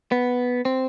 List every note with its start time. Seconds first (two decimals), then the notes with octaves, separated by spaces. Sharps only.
0.12 B3
0.65 C4